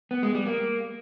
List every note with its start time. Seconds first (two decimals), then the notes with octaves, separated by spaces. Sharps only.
0.11 B3
0.23 G#3
0.35 G3
0.47 A#3